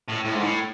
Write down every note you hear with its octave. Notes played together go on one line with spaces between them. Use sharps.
A2
A2
G#2
A2